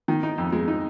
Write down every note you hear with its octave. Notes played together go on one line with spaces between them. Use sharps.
D#3
D#4
F2
G#3
D#4